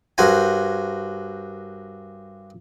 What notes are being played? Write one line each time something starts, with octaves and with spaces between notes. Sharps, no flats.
G2 F#4 A#4 C5 G#5